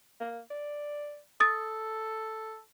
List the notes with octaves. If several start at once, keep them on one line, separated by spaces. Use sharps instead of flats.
A#3
D5
A4 D#6 A6